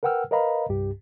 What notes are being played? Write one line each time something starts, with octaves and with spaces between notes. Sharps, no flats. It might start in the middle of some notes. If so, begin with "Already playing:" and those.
A#4 B4 F#5 G5 E6 F6
A#4 B4 D#5 F5 A#5 B5
C2 G2 G4